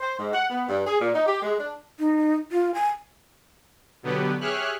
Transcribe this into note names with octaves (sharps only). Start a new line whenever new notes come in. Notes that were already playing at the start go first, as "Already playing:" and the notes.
C5
G#2
F#5
B3
G2
G#4
A#2
D#4
G4
G#3
D4
D#4
F4
G#5
B2 D3 F#3 B3 G4 B4
G4 G#4 C#5 E5 F6 F#6